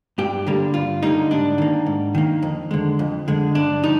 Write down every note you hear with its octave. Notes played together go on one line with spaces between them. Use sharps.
G2 G4
D3 G3 A#3
G2 F4
D3 G3 A#3 D#4
G#2 D4
D#3 A#3
G#2
D#3 A#3
F2
D3 G#3
F2
D3 G#3
G2 D4
F3 D#4